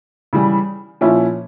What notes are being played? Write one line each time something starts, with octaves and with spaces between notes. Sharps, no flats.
C#3 E3 G3
A#2 F3 C#4 E4